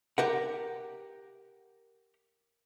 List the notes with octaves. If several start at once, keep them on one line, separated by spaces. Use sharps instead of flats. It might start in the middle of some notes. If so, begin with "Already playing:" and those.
G4 A#4 F#5